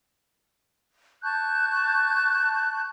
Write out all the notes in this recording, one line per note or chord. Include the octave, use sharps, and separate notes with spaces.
A5 C#6 F#6 G6